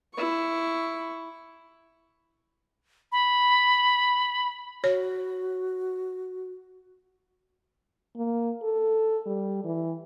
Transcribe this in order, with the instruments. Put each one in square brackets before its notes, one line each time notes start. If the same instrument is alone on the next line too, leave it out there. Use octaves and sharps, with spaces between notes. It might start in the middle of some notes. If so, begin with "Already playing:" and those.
[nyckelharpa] E4 C#6
[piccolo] B5
[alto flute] F#4 [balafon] C#5
[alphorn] A#3
A4
G3
E3